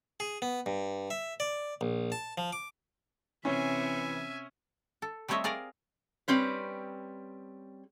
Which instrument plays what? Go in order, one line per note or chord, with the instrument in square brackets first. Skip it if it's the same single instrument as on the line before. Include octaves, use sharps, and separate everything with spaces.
[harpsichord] G#4
B3
G2
E5
D5
A#1
A5
F3
D6
[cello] C3 [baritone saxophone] E3 [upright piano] C#4 [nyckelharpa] E5 G#5
[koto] A4
G3 A3 C4 C#5 D#5 E5
G#4 A#4 D5 F5 G#5 A#5
[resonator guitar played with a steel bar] G3 C4 C#4 B4